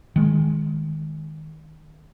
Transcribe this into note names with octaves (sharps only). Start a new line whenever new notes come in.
D#3 G#3